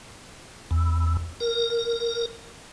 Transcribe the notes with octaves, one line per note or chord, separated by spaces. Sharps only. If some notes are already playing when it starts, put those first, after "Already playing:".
E2
A#4